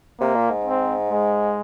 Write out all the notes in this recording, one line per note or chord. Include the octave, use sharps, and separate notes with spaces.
C3 A#3
A#2
G#2
C4
G#3